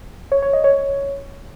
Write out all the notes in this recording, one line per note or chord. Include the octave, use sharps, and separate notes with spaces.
C#5
C#5
D#5
C#5